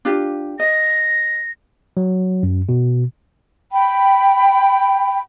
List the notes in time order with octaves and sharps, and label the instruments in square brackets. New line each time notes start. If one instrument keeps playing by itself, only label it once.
[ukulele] D4 F4 G4
[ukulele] D#5 [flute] A#6
[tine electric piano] F#3
F#2
B2
[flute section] G5 B5